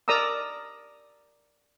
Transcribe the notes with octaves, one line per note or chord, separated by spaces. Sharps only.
A#4 D5 A#5 D#6 E6